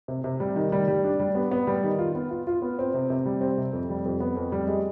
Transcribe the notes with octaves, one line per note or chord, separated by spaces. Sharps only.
C3
C3
G3
D#3
G3
G3
D4
G3
B3
B3
G3
D#3
F4
B3
F4
F4
B3
C4
C3
C3
G3
C4
C3
F2
G3
F2
B3
F2
G3
G#3